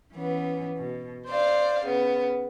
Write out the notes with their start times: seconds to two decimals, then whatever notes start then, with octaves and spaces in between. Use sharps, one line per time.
0.14 E3 B3 C#4
0.78 B2
1.27 C5 D5 F5
1.84 C#3 B3